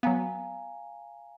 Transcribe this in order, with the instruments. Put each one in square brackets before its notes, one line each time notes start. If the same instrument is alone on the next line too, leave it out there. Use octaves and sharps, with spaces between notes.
[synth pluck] F#3 B3 [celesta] F5 G#5 A#5